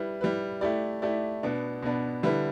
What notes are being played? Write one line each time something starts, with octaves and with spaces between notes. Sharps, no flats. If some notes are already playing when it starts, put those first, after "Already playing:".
Already playing: G3 E4 B4
G3 E4 B4
A3 E4 G4 D5
A3 E4 G4 D5
B2 B3 D4
B2 B3 D4
D3 G3 E4 B4